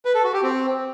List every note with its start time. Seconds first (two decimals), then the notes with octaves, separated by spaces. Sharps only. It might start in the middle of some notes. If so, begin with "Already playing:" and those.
0.05 B4
0.15 A4
0.24 F#4
0.33 G4
0.43 C4